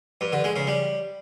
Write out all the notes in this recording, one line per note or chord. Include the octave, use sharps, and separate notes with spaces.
G2
D3
G#3
C#3
G3